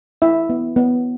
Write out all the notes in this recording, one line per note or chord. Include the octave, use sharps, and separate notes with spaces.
E4 E5
B3
B3